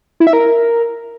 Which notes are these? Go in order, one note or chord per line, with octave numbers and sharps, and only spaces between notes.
E4
E5
A#4